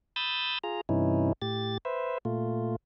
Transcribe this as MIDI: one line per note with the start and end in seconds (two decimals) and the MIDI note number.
0.16 0.58 83
0.16 0.58 87
0.16 0.58 88
0.16 0.58 91
0.16 0.58 93
0.64 0.81 65
0.64 0.81 68
0.64 0.81 82
0.89 1.33 43
0.89 1.33 48
0.89 1.33 52
0.89 1.33 61
0.89 1.33 63
0.89 1.33 64
1.42 1.78 45
1.42 1.78 67
1.42 1.78 93
1.85 2.18 71
1.85 2.18 72
1.85 2.18 76
2.25 2.76 46
2.25 2.76 57
2.25 2.76 65